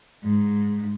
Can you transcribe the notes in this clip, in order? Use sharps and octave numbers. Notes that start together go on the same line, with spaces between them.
G#2